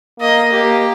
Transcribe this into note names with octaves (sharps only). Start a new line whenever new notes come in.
A#3 D#5
A#3 G4